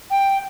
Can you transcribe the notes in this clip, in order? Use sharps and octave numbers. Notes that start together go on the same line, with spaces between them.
G5